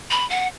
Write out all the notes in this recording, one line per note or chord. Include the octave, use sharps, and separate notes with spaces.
B5
F#5